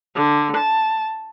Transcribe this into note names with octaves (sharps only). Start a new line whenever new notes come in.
D3
A5